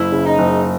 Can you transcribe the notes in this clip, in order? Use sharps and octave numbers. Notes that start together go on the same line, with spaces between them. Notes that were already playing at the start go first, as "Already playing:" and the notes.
Already playing: F#1 E4
C#3
D#4
F#1